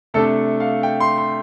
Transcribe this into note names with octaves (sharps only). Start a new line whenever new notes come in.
C3 A3 D4 A4
F5
G5
C6
C6